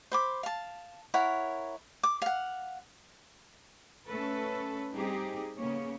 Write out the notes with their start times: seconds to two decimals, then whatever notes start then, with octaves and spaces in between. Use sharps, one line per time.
0.12 C5 B5 D6
0.43 F5 A5
1.14 E4 A#4 C#5 F#5
2.03 D6
2.22 F5 F#5
4.07 A3 C#4 A4 B4
4.94 G3 C4 D#4 G4 G#4
5.56 C#3 A#3 B3 C#4 C#5